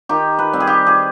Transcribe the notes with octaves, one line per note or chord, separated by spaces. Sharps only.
D#3 G4
B4
G3 C4
G#4
G4
G#4